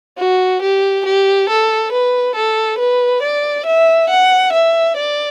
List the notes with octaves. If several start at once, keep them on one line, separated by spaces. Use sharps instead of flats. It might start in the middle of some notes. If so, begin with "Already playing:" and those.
F#4
G4
G4
A4
B4
A4
B4
D5
E5
F#5
E5
D5